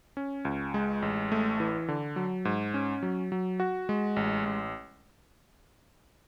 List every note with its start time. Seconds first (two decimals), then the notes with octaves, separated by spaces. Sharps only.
0.17 C#4
0.45 C#2
0.74 G#3
1.02 A1
1.32 A3
1.60 E3
1.88 D3
2.16 F#3
2.45 G#2
2.74 C#4
3.03 F#3
3.32 F#3
3.60 F#4
3.89 G#3
4.16 A1
4.45 A1